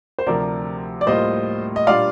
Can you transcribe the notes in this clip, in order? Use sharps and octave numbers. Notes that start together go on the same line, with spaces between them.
C5
D2 C3 F3 A#4 D5
D5
A2 G3 A#3 F4 C5 D#5
D#5
A#2 G3 D4 F4 D5 F5